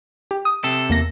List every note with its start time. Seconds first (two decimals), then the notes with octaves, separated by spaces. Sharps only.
0.31 G4
0.45 D#6
0.64 C3 A4
0.90 E2 A#3 A#6